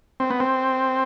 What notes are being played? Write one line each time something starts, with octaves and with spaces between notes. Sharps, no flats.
C4
B3
C4